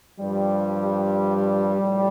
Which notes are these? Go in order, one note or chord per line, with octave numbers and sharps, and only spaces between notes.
G2 F3 G3
A2 F3